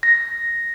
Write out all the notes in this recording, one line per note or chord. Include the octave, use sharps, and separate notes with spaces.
A#6